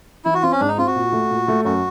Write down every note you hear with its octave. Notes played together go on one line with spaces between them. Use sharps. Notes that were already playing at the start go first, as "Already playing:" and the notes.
E3 E4
F#4
C4 F4
C#4
G#2 D4
D#4
C4 F4
F#4
A#2
A3
A#2
A3
F#2 F#4